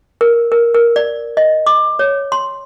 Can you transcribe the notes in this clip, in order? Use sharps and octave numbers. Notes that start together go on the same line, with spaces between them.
A#4
A#4
A#4
D5
D#5
D6
C#5
C6